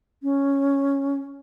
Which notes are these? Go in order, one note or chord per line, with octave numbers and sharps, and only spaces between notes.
C#4